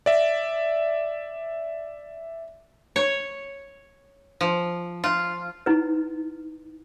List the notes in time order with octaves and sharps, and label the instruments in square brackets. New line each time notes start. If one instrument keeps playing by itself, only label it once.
[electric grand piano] D5 E5
[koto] C#5
F3
F4
[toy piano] D#4 E4 B4